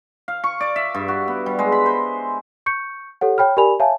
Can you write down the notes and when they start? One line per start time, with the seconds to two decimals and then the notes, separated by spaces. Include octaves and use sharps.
0.28 F5
0.44 C#6
0.61 D5
0.76 E5
0.94 G2
1.08 F#4
1.28 B3
1.46 G3
1.59 G#3
1.72 B5
1.86 C5
2.66 C#6 G6 C#7
3.21 G4 A4 C#5 F#5
3.38 C#5 G5 B5 F6
3.57 G4 A#4 D5 G#5 B5 F7
3.80 C#5 E5 F5 G#5 A5